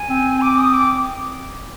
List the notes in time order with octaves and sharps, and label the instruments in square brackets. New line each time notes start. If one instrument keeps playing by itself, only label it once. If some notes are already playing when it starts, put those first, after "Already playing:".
Already playing: [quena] G#5
[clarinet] C4
[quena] D6
D#6
D6